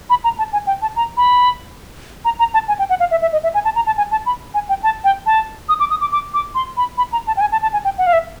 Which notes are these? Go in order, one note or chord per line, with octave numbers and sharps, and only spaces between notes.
B5
A#5
A5
G#5
G5
A5
A#5
B5
A#5
A#5
A5
G#5
G5
F#5
F5
E5
E5
D#5
E5
G#5
A5
A#5
A5
G#5
A5
B5
G#5
G5
A5
G5
A5
D#6
D6
D#6
D6
D6
D6
C6
B5
B5
A#5
A5
G5
G#5
A5
A5
G#5
G5
F#5
F5
E5